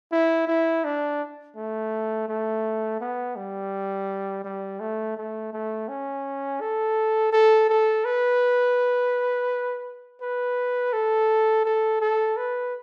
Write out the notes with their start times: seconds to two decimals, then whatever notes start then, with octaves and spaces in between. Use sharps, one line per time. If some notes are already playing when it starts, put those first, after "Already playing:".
0.12 E4
0.48 E4
0.85 D4
1.56 A3
2.29 A3
3.01 B3
3.36 G3
4.44 G3
4.80 A3
5.17 A3
5.53 A3
5.89 C#4
6.61 A4
7.32 A4
7.69 A4
8.05 B4
10.21 B4
10.93 A4
11.66 A4
12.01 A4
12.37 B4